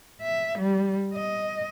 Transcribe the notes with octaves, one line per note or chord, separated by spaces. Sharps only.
E5
G3
D#5